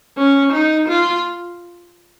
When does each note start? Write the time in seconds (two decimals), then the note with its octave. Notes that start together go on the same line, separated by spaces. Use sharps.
0.18 C#4
0.52 D#4
0.88 F4